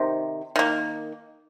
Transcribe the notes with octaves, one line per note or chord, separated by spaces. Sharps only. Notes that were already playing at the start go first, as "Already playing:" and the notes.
Already playing: C3 D#3
D#3 A#3